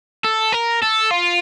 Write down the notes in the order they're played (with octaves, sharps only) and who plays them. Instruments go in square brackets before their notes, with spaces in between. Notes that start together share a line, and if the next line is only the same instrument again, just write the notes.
[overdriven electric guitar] A4
A#4
A4
F4